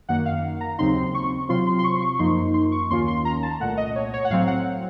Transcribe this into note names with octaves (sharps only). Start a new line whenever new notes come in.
F#2 D#3 A#3 F#5
F5
A#5
D#2 C#3 F#3 C4 D#4 C6
C#6
C3 F#3 C4 F4 C6
C6
C6
C#6
C#6
F#2 F3 A#3 D#4 C6
C6
C#6
D#2 D#3 A#3 C#4 F4 C6
C6
A#5
A5
C2 A#2 A3 F#5
D#5
C#5
C#5
F#5
A2 F#3 C4 F5
F#5